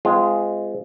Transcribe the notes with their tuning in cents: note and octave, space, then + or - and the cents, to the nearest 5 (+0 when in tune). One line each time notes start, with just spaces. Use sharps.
G#3 +0 C4 -35 F4 -15